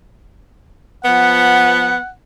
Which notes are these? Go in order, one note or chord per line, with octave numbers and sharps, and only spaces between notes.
F3 B3 F#5